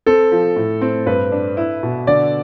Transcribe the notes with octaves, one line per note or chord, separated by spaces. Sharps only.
C4 A4
F3
A2
C4
G2 B4
D4
E4
B2
D3 D5